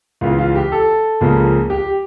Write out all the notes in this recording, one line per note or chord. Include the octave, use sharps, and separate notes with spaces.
C#2 C#3 E3 F4
F4
G4
A4
C#2 C#3 F3 A#3
G4